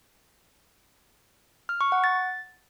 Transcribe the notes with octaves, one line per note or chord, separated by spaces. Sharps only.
F6
C#6
F#5
A6